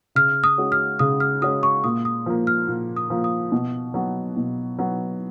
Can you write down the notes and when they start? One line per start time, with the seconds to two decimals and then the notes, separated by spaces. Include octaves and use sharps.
0.15 C#3 F6
0.44 D#6
0.58 G#3 C#4 F#4
0.72 F6
0.99 C#3 D#6
1.20 F6
1.42 G#3 C#4 F#4 D#6
1.63 C#6
1.84 A#2 D#6
2.05 D#6
2.26 F3 A#3
2.47 F6
2.68 A#2
2.97 D#6
3.10 F3 A#3
3.24 D#6
3.52 B2
3.94 F#3 B3
4.37 B2
4.79 F#3 B3